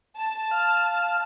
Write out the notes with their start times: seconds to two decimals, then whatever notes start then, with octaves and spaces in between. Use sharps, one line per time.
0.18 A5
0.51 F5 F6